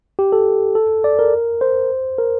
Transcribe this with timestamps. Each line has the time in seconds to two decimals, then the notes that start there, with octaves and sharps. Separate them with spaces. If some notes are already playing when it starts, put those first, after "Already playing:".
0.19 G4
0.32 A4
0.75 A4
1.04 D5
1.19 A#4
1.61 C5
2.18 A#4